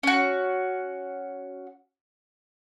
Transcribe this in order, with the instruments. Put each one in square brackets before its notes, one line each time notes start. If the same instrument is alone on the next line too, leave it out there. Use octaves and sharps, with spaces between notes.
[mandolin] C#4 F#4